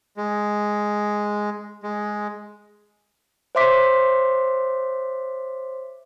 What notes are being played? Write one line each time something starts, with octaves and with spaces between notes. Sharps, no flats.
G#3
G#3
C5 C#5 E5 C6 D6 B6